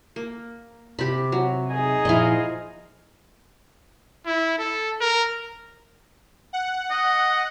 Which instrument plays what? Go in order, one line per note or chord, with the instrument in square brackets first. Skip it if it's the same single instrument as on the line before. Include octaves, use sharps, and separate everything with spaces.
[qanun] A#3
[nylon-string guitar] C3 [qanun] G4 B5
[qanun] F#3
[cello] D#4 G#4
[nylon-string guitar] A#2 F3 E4 [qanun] D#5 F5
[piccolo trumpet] E4
A4
A#4
[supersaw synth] F#5
[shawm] D#5